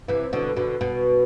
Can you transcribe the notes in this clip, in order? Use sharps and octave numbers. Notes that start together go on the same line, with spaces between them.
C3 E3
B2 D3
B2 D3
B2